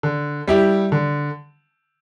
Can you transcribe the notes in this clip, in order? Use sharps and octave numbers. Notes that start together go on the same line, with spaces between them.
D3
G3 E4 G4
D3